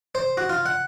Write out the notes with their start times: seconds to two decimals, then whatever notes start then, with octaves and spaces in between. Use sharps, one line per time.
0.15 C5
0.37 F#4
0.49 F4
0.66 F#5